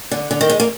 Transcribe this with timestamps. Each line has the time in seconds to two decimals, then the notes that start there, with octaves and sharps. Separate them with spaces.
0.11 D3
0.31 D3
0.41 D#3
0.49 G#3
0.60 A#3